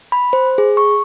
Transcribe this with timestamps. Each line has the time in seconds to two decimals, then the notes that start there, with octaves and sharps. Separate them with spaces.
0.12 B5
0.33 C5
0.58 G#4
0.77 C#6